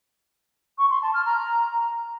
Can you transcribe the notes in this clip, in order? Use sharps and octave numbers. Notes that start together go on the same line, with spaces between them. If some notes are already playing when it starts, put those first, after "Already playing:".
C#6
C6
A5
F6
A#5